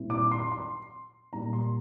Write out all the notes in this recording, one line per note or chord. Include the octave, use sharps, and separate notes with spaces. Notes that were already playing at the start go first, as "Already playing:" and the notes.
Already playing: A#2 G3 C4 E4
D6
C6
C6
A#2 G3 A#3 A#5
C6